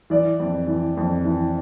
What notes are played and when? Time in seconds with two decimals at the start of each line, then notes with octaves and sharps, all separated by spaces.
0.10 E3 D5
0.39 F2
0.67 E3
0.97 F2
1.24 E3